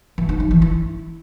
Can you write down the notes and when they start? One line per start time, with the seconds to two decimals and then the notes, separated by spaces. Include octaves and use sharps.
0.18 E3
0.29 D#4
0.40 F#3
0.51 E3
0.62 E4